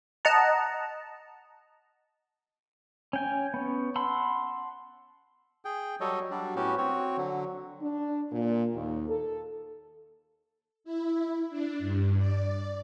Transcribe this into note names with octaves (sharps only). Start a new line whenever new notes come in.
D#5 F#5 A5 A#5
C#4 G5 G#5
B3 C#4
F#5 A5 B5 C6 E6
G#4 G5
F#3 G3 A4 C#5 D#5
F#3 G3 D4
A2 B3 C#4 F#4 G4
C4 F#4 C#5
D3 F#3
D4
A#2
D#2
A4
E4
D4
G2
D5